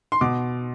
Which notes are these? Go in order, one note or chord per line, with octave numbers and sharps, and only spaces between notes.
C6
B2 D6